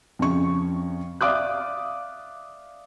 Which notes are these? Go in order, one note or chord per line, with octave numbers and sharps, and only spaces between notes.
F2 C#3 C#6
D5 E5 F5 D6 D#6 F#6